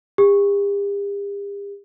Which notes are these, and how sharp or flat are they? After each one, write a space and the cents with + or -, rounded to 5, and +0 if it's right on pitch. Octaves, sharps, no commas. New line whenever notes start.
G4 +45